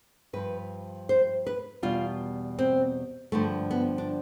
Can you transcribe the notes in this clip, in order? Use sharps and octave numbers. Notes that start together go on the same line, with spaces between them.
G2 F3 B4
C5
B4
E2 B2 G3 F4
C4
G2 D3 F3 A3
B3
D4